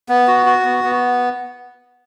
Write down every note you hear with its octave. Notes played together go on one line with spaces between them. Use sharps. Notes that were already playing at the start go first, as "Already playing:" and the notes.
B3
F#4
F#4
B3
B3